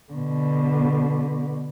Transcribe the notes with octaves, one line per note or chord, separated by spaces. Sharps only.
B2 D3